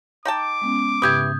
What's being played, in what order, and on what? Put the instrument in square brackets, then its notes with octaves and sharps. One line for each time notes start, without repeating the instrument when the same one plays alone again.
[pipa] D#4 G5 A5 [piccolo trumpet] D6
[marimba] G#3 B3 C#4
[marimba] G#2 C#3 [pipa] E4 G4 B4 [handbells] D#6 G6 G#6